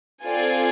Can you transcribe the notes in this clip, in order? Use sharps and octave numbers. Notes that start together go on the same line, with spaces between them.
C4 F4 A4 D5 G#5